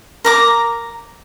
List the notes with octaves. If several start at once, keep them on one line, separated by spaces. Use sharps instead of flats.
A#4 A#5 D6